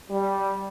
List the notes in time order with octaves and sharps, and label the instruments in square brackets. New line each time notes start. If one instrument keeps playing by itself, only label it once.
[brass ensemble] G3